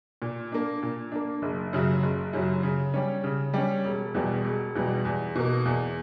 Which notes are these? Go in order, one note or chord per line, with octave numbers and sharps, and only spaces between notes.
A#2
A#3 D4
A#2
A#3 D4
F#1
F#2 C#3 F#3
F#1
F#2 C#3 F#3
C#3
G3 C#4
C#3
G3 C#4
E1
E2 B2 G3
E1
E2 B2 G3
E2
B2 A#3
E2